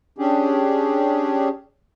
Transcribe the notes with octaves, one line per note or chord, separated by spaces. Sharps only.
C#4 D4 G4 G#4